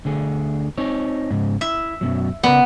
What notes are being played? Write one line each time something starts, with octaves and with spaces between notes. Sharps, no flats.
D2 D3 G#4
C4 D#4 C#5
G#2 C#3
E4 E5
F#2 B2 F#3
C#3 B3 A#4 D5